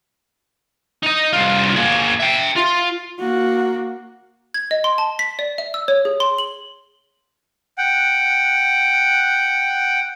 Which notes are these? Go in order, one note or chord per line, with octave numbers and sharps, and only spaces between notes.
D#4 D#5
C2 F4
A#3 G#4
E5 G5
F4
A#3 F#4
G#6
D#5
C6
A5
B6
D5
E5
E6
C#5
G#4
C6
F#7
F#5 G5